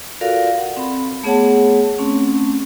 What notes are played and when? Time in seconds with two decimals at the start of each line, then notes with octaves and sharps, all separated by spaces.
0.21 F4 F#4 A4 A#4 D5 F5
0.58 F#5
0.77 C4 B5
1.23 A3 B3 G#4 C#5 F#5 A5
1.99 A3 C4 C#4